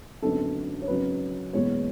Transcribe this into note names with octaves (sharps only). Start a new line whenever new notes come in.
G#1 F#2 D3 F#3 B3 A4
C#5
G#1 F#2 C#3 F#3 B4
F#1 E2 B2 G#3 B3 C#5